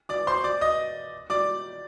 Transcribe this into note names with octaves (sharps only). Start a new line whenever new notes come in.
D5 D6
C5 C6
D5 D6
D#5 D#6
D5 D6